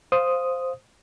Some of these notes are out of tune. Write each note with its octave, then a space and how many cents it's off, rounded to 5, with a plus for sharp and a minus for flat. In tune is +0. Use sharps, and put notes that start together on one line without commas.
C5 +0 F5 +0 D#6 +0